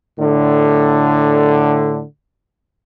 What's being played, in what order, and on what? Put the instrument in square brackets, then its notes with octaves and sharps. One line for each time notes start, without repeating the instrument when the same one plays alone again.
[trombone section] A2 D3